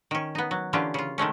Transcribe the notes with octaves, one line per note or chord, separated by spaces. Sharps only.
D#3 C#4
B3 D#4
F#3
D3 E3 A#3 C#4 F4 G4
C#3 F4
D#3 G#3 A3 C#4